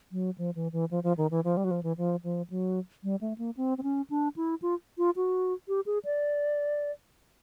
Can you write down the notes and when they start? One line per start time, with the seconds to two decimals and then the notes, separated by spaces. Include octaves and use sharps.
0.12 F#3
0.38 F3
0.55 E3
0.73 E3
0.91 F3
1.04 F3
1.18 D#3
1.31 E3
1.44 F3
1.57 G3
1.64 F#3
1.71 F3
1.83 E3
1.98 F3
2.24 F3
2.50 F#3
3.03 G3
3.21 A3
3.38 A#3
3.57 C4
3.78 C4
3.83 C#4
4.10 D4
4.36 E4
4.62 F4
4.98 F4
5.16 F#4
5.68 G4
5.86 G#4
6.05 D5